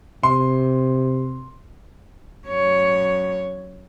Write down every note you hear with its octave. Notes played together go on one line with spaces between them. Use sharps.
C3 C6
F#2 C#5